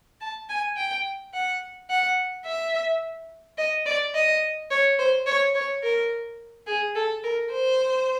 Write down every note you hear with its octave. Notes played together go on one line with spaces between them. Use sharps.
A5
G#5
G5
F#5
F#5
E5
D#5
D5
D#5
C#5
C5
C#5
C#5
A#4
G#4
A4
A#4
C5